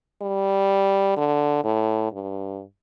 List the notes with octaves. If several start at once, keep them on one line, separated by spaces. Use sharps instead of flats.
G3
D3
A2
G2